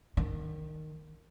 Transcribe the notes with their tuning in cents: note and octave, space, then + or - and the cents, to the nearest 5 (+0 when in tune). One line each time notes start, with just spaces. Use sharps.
D#3 -10